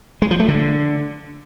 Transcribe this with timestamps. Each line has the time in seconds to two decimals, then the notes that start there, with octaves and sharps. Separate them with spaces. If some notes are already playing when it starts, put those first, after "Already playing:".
0.22 G#3
0.31 F3
0.40 A3
0.48 D3